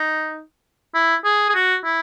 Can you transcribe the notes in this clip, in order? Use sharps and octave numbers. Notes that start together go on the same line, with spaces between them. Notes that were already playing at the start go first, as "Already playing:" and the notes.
Already playing: D#4
E4
G#4
G#4
F#4
E4